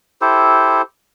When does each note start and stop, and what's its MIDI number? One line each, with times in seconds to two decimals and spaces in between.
0.21 0.82 64
0.21 0.82 67
0.21 0.82 69
0.21 0.82 72